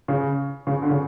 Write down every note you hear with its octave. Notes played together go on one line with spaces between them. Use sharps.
C#3
C#3
D3
C#3